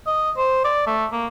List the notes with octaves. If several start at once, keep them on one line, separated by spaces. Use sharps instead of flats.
D#5
C5
D5
A3
A#3